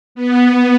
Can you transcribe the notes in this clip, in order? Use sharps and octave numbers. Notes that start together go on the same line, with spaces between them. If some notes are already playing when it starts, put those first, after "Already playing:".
B3